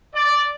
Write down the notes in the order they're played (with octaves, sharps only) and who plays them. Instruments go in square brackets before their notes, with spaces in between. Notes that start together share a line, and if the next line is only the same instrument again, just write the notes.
[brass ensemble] D5